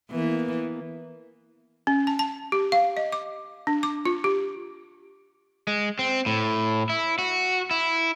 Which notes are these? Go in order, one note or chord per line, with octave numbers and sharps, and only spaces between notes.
E3 A#3 B3
C#4
A5
A5
G4
F5
D#5
D6
D4
D6
F4
G4
G#3
C4
A2
E4
F#4
E4